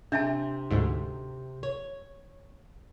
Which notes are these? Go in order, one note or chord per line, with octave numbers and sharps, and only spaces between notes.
C3 D4 E5 A5
D2 G#2
C#5